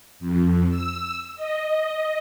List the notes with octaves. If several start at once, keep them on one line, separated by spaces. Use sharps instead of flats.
F2
E6
D#5